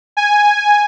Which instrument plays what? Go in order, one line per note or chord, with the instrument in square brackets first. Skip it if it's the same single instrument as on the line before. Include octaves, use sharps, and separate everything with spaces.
[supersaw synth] G#5